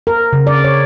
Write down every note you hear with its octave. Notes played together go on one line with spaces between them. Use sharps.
A#4
C#3
D5
C#5